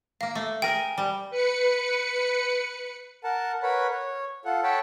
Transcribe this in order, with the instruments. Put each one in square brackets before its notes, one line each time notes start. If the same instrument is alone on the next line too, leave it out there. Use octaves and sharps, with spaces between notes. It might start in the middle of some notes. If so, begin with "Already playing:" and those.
[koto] A#3 A#5 [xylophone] F5
[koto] A3
[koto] G#4 A#4 [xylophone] G5
[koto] G3
[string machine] B4 C#7
[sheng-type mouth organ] A#4 F#5 A5
A#4 B4 C#5 F#5 B5
C#5
F4 A4 F#5
A4 C#5 F#5 G5 A5 B5